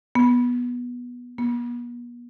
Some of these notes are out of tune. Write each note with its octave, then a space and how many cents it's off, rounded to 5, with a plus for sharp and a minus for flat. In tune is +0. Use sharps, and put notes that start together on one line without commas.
B3 -15
B3 -45